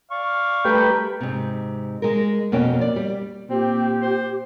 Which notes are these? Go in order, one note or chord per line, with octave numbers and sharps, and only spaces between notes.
D5 F5 C#6
G3 A3 G4 A#4 B4 G5 B5
G#2 C3
G#3 A#4
F2 B2 A#3 C#4 G5
D5
G3
A#2 C4 G4
C5